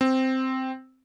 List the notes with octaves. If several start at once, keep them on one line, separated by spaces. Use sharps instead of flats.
C4